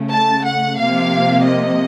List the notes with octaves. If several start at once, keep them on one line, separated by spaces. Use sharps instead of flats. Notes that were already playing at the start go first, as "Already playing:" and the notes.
Already playing: C#3 A3
A5
F#5
C3 F3 A#3 F5
D#5